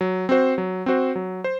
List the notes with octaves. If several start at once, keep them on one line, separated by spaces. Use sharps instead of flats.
F#3
C4 F#4 C5
F#3
C4 F#4 C5
F#3
C5